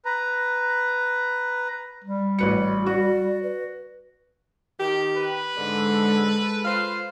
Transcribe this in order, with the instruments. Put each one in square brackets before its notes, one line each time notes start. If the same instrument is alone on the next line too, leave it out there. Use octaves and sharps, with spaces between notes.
[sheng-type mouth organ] B4 A#5
[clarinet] G3
[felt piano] A1 B4 C#7 [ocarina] F#4
[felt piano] F#4 [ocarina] D5
[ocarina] B4
[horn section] D#3 G4
[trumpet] B4
[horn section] G#2 D3 [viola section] G#3 A4
[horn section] F4 C5 F5